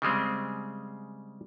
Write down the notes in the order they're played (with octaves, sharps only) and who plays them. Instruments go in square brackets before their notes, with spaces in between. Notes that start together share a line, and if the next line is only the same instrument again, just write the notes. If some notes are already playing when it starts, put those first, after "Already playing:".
[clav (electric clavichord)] C#3 G3 G#3 C4